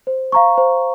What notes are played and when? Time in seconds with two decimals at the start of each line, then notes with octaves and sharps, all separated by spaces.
0.07 C5
0.32 F5 A#5 C#6
0.57 C5